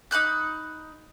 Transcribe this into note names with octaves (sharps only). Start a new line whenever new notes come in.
D#4 B5 F#6 G6